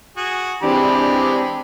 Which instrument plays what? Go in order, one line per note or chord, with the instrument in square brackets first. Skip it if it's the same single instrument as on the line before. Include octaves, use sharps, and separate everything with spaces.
[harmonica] F#4 G#4
[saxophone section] E3 G4 [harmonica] G#3 B5 [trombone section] C4 D4